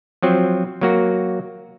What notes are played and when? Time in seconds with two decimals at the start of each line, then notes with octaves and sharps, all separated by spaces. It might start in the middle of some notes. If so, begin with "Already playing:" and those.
0.23 F3 F#3 C4
0.81 F#3 A#3 F#4